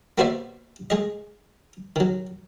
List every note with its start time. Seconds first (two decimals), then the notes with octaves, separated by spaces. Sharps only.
0.18 A#3 B3 F#4 C5 D5 E5
0.90 G#3 G#4 D#5
1.96 D#3 F#3